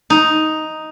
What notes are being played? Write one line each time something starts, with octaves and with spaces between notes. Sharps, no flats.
D#4